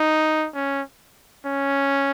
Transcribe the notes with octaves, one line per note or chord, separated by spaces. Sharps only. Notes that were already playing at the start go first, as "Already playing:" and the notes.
Already playing: D#4
C#4
C#4